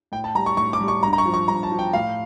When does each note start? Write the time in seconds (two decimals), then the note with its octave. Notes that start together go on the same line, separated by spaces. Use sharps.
0.12 A2 G5
0.24 A5
0.35 G3 A#5
0.46 C#6
0.57 A2 C#6
0.73 D6
0.81 G3
0.88 C#6
1.03 G2 A#5
1.13 A#5
1.18 C#6
1.26 F3
1.34 C#6
1.48 G2 A#5
1.63 A5
1.72 F3
1.79 G5
1.93 A2 F5